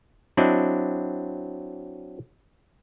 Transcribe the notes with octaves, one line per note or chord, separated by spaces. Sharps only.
F#3 C4 D4 E4 D5 D#5